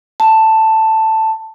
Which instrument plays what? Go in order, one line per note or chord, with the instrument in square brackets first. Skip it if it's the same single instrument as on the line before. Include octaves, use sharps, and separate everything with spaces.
[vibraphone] A5